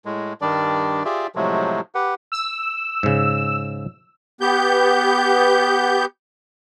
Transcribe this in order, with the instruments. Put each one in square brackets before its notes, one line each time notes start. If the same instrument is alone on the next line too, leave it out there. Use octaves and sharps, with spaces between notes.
[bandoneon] A2 G#3
G2 D#3 G3 D4 D5
F4 G4 G#4 D5 E5
A2 C3 F3 F#3 G#3 A3
G4 B4 F#5
[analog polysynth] E6
[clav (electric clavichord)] G#2 C#3
[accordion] B3 G4 G6